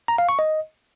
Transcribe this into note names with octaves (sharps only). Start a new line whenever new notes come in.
A#5
F5
C#6
D#5